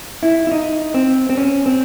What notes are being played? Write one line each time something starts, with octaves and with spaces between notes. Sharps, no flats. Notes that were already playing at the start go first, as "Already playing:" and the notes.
E4
E4
D#4
C4
C4
C#4
C4